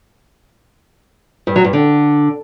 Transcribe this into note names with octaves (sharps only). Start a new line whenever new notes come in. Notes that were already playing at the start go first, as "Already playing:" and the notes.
G2
F#3
G2
D3